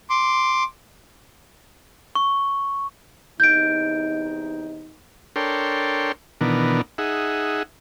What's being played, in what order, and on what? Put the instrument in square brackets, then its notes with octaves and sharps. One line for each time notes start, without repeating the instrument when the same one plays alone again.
[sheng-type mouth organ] C6 D6
[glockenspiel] C#6
[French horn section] E2 C3 D#4 [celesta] G6 D7
[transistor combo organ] D4 A4 A#4 C#5 G5 C6
B2 D#3 E3 B3 D4 A#4
D#4 G#4 E5 F#5